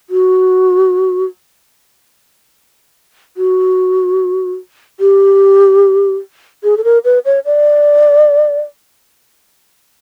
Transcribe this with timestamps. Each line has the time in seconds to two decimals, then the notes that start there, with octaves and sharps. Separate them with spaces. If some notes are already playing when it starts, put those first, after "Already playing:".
0.10 F#4
3.37 F#4
5.00 G4
6.64 G#4
6.77 A4
6.84 A#4
7.05 B4
7.25 C#5
7.45 D5